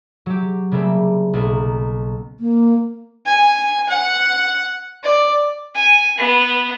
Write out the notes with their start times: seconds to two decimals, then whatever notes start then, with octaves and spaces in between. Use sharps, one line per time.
0.26 F#3 G4
0.72 C#3 G3 A3 A#3 C4
1.33 B1 A#3 B3
2.40 A#3
3.26 G#5
3.89 F#5
5.04 D5
5.75 G#5
6.18 B3